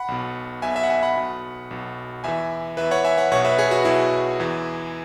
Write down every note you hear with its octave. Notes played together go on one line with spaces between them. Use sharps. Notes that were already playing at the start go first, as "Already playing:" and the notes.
Already playing: F#5 B5
B1 B2
B1 B2 E5 G#5
E5 G#5
F#5
E5 G#5
F#5 B5
B1 B2
B1 B2
E2 E3 E5 G#5
E2 E3 B4 E5
C#5 F#5
E5 G#5
C#5 F#5
B1 B2 C#5 F#5
B4 E5
G#4 C#5
F#4 B4
B1 B2 E4 G#4
E2 E3